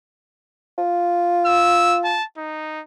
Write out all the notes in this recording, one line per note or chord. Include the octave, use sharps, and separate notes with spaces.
F4
E6
A5
D#4